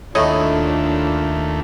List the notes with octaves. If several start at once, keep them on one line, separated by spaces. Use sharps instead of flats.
D#2 A2 A3 D4 F4 C#5 D#5